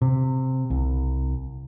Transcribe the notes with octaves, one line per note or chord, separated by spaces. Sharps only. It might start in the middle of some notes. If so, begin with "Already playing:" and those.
C3
C2